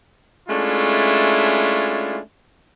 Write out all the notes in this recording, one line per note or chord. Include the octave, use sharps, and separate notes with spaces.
G#3 A3 C#4 D4 E4 F4